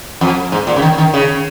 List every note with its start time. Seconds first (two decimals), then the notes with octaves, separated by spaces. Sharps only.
0.21 F2
0.52 G#2
0.67 A#2
0.76 C#3
0.82 D#3
0.98 D#3
1.14 C#3